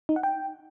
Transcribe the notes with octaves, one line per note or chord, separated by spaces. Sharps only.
D#4
F#5
G5